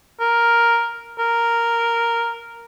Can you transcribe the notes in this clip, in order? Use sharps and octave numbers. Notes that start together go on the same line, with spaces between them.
A#4
A#4